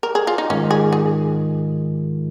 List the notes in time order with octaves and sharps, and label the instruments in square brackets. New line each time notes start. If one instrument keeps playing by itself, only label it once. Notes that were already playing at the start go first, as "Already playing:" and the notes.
[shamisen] A#4
G#4
F4
D#4
[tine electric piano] G#2 D#3 G#3 F4 [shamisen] C#4
[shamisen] G#4
G#4